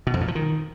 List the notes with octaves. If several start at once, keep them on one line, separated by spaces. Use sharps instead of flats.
B2
F2
A#2
F3
D#3